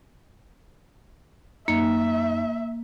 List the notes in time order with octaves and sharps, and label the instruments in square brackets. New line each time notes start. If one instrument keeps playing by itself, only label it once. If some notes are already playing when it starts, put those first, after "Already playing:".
[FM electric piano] F#2 D#4 [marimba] A#3 [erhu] E5